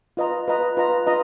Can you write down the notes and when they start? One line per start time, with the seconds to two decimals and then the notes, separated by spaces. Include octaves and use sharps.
0.17 F4 B4 D#5 A#5
0.48 F4 B4 D#5 A#5
0.77 F4 B4 D#5 A#5
1.07 F4 B4 D#5 A#5